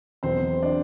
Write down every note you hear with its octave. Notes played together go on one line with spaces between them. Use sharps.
E1 E2 B2 F#3 C4 C5
D4 D5